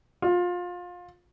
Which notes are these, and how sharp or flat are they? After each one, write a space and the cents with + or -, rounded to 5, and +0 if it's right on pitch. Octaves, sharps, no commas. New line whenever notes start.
F4 +25